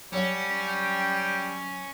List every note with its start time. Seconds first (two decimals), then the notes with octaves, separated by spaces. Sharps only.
0.13 F#3 G3 C#4 F#5
0.68 G5